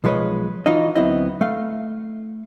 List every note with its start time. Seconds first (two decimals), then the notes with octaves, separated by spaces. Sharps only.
0.04 B1 F3 G#3 B4 C#5 D#5
0.66 E3 D#4 F4 F#4 D#5
0.95 D2 F#3 B3 C4 E4 D#5
1.41 A3 F5